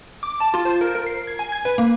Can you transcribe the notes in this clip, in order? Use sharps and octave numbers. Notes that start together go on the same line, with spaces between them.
D6
A5
F4
C5
A#4
A#4
C7
G#6
G#5
G#6
B4
A#3